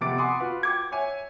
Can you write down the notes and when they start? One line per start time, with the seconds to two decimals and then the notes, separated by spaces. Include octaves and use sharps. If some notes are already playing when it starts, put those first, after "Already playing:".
0.01 F2 C3 B3 D6 A6 D7
0.18 F#5 G#5 B5 C6 D6 D#6
0.40 F4 F#4 B4
0.63 G5 D6 G#6
0.92 C#5 E5 G#5